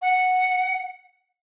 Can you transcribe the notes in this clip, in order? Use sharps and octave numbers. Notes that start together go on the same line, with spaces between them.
F#5